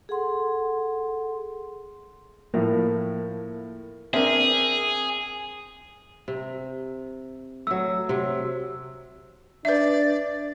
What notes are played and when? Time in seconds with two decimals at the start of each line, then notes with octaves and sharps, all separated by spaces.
0.09 G#4 A4 F#5 C6
2.54 A2 F3 A#3 E4
4.14 C4 D4 G#4 A#4 E5
6.28 C3
7.67 F#3 A3 E6
8.09 C3 F#3
9.65 D4 B4 D5 E5